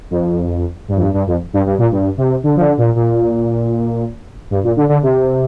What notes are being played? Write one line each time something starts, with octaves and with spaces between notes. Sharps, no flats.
F2
G2
F2
G2
G2
F2
G2
G2
A#2
G2
C3
D3
F3
D3
A#2
A#2
G2
A#2
D3
D3
C3